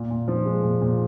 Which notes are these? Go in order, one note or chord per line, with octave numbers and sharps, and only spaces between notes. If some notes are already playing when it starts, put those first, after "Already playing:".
Already playing: A#2
A#2
F3
G#3
A#2
A#2